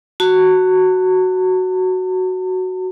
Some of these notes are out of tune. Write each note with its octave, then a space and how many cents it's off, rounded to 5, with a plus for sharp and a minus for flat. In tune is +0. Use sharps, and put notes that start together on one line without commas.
F#4 +5 A5 +45